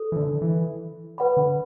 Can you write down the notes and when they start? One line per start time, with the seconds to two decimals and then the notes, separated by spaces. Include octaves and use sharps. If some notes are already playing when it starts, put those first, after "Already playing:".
Already playing: A4
0.12 E3
0.16 D3
0.42 E3
1.18 B4 F#5 B5
1.37 D3